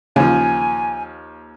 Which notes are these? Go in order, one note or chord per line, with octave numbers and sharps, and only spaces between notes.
D#2 C#3 F3 G#5